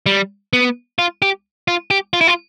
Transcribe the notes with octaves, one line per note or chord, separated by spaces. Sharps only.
G3
B3
F4
G4
F4
G4
F4
E4
F4